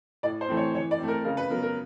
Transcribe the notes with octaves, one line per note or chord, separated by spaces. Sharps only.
A2 D5
C5
E3 A3 C4
C#5
E3 C#5
D5
A3 C4
A#4
C#3 A#4
B4
F#3 B3 A#4
A#4